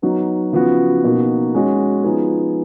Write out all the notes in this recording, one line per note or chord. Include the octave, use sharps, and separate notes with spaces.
F#3 B3 D#4 F#4
C#3 F3 B3 F#4
B2 A#3 D#4 F#4
G#3 C#4 F#4
F3 B3 D#4 G#4